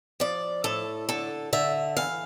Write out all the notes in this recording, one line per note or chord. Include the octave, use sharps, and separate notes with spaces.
F3 D5
A2 A4
D3 A4
D3 E5
E3 F5